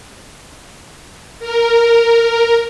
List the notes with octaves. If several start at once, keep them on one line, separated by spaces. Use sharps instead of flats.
A#4